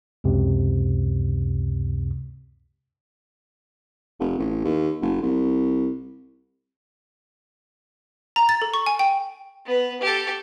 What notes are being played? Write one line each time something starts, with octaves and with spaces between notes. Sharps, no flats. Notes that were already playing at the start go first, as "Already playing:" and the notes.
C#2 F#2 C3
F1
A1
D#2
F#1
C2
A#5
A6
A4
C#6
G#5
G5
B3 B4
G4 A4